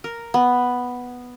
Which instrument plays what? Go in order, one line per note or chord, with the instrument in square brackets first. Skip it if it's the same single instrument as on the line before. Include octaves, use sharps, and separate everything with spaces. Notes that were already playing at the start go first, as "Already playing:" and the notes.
[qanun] A#4
B3